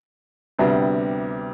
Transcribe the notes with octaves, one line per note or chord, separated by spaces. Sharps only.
D2 C3 G3 B3 D4